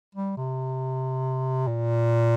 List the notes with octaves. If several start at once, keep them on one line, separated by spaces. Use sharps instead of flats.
G3
C3
A#2